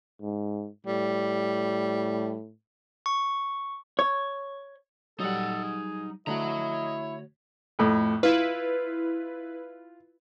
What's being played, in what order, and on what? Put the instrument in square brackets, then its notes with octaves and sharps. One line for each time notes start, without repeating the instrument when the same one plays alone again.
[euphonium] G#2
[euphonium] A2 [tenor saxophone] G3
[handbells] C#6
[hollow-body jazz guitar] C#5
[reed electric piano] F#3 G3 [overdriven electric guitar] D#4 F#5 [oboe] A4
[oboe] G#4
[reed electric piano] D3 A3 F#4 [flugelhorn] E4 [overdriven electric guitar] C#5 A#5 [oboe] D#5
[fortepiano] F2 A2
[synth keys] E4 B4 [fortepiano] F4